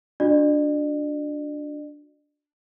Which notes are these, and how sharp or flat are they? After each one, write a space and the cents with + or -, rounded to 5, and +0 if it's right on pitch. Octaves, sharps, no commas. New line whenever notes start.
D4 +0 F#4 -35 D5 +45